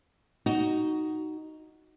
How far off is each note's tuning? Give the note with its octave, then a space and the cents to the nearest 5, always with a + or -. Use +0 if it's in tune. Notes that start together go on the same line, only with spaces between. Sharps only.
D#4 +0 F#4 +15